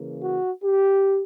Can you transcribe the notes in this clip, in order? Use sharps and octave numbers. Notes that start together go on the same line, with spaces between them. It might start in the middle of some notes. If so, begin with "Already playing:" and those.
Already playing: C#3 E3 A#3
F#4
G4